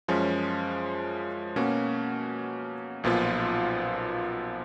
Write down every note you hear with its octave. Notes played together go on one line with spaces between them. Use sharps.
F#2 F3 G#3 C#4
B2 A#3 C#4 F#4
B1 A#2 F3 B3 F4